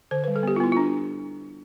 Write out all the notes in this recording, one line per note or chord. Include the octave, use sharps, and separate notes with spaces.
D3 C5
G3 B4
A4
B3 G4
F4
B3 E4
D4 F4